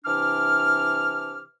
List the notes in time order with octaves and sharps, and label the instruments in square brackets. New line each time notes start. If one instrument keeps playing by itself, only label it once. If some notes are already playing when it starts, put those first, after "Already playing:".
[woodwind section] C3 E3 D4 D6 F6